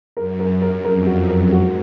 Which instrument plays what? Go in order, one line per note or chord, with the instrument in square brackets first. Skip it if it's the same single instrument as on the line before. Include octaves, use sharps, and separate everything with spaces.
[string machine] F#2 [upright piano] A#4
[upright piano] A#4
A#4
[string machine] F2 [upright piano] A#4
[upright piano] F#4
[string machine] F#2
[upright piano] A#4
[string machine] G#2 [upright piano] F#4